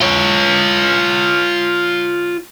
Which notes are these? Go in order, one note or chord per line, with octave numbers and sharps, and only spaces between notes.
F4 C#5